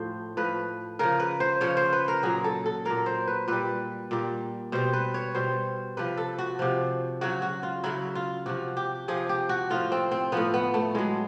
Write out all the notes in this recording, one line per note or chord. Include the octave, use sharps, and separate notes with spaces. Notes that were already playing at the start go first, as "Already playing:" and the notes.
Already playing: A2 F3 C5
A2 F3 B4
C#3 F3 A#4
B4
C5
C#3 F3 C#5
C5
B4
A#4
A#2 F#3 G#4
A4
A4
A#2 F#3 A#4
C5
B4
A#2 G3 B4
A#2 G3
B2 G3 C5
B4
C#5
B2 G3 C5
C3 F3 B4
A4
F#4
C3 F3
C#3 F#3 F#4
F#4
F4
C#3 F#3 E4
F4
C3 F3 F#4
G4
C3 F3 G#4
G4
F#4
A2 F3 F4
C4
C4
A2 F3 B3
B3
A3
A2 F#3 G#3